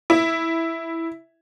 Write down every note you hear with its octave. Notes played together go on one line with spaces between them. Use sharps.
E4